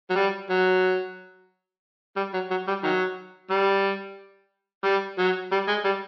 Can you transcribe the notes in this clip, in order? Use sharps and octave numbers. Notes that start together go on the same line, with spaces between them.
F#3
G3
F#3
G3
F#3
F#3
G3
D#3 F#3
G3
G3
F#3
G3
G#3
G3